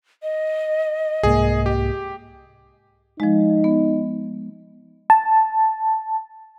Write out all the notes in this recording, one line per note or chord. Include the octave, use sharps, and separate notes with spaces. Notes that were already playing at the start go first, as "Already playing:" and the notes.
D#5
C2 G#2 A#3 G#4
G4
F3 G#3 D#4
B3
A5